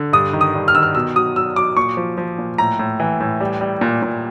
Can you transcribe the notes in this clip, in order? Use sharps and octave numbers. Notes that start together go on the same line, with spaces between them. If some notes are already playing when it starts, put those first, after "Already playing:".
Already playing: D3
G2 D#6
D#3
D#6
G2
F6
D#3 E6
F6
B2 E6
F#3 D#6
F#3 E6
F#3 D6
A#2 C#6
F3
F3
A#2
A2 A#5
A2
E3
A2
G3
G3
A#2
A#2